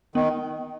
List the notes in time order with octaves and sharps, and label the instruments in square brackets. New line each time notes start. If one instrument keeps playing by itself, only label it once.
[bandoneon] D#3 [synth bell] B3